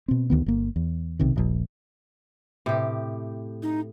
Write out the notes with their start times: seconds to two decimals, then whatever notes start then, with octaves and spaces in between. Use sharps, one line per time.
0.08 B2 C4
0.30 D2 D#3 B3
0.46 G1 A#3
0.76 E2
1.19 B1 C3 D#3
1.36 D#1 A#1
2.66 A2 C3 G4
3.63 D#4